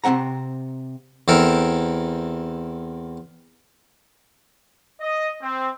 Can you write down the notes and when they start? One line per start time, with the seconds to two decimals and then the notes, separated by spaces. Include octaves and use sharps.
0.04 C3 G#3 C4 F#5 A#5
1.28 E2 C4 E4 A4 A#4
5.00 D#5
5.41 C4